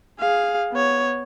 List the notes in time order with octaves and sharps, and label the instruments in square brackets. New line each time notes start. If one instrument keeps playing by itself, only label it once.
[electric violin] G#4 F5
B3 C#5